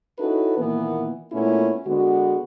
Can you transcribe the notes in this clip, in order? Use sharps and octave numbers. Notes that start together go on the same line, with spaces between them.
C#4 D#4 E4 F#4 A4 B4
A#2 D#3 E3 A#3 B3
A#2 A3 B3 C#4 E4 F4
D3 G#3 B3 F#4